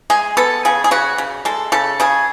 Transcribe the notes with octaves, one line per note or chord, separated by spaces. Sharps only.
G#3 G#4
B3 A4
C#3 G#4
G#4
C#3 F#4
C#3
G#3 A4
C#3 A4
C#3 G#4